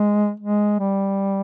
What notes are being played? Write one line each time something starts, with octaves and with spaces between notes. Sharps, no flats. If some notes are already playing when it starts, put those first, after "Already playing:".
Already playing: G#3
G#3
G3